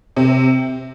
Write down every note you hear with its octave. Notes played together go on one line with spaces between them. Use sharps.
C3